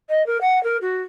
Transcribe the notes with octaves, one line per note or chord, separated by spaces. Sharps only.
D#5
A#4
F#5
A#4
F#4